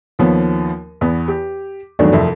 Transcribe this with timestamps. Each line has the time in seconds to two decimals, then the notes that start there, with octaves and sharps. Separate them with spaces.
0.19 D#2 F3 B3 C#5
1.01 E2 B3
1.28 G4
1.99 E2 G2 D#3 F#3 A3 D4
2.13 C2 F2 E5